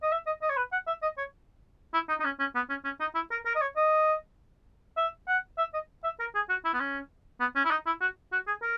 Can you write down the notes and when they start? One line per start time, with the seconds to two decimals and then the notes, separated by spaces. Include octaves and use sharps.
0.02 D#5
0.12 E5
0.27 D#5
0.42 D#5
0.50 C#5
0.57 B4
0.72 F#5
0.87 E5
1.02 D#5
1.18 C#5
1.94 E4
2.09 D#4
2.20 D#4
2.24 C#4
2.40 C#4
2.55 B3
2.69 C#4
2.85 C#4
3.00 D#4
3.15 E4
3.31 A#4
3.46 A#4
3.55 D#5
3.62 C#5
3.77 D#5
4.97 E5
5.28 F#5
5.58 E5
5.74 D#5
6.04 E5
6.20 A#4
6.35 G#4
6.49 F#4
6.65 E4
6.74 B3
6.80 C#4
7.40 B3
7.55 C#4
7.65 E4
7.71 D#4
7.86 E4
8.01 F#4
8.32 F#4
8.47 G#4
8.62 A#4